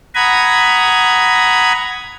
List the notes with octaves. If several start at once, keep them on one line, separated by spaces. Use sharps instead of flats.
F#5 A#5 B5 D#6 G#6